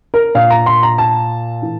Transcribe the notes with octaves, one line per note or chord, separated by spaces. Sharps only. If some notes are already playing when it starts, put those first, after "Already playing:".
A#4
A#2 F5
A#5
C6
A#5
A5
A2 E3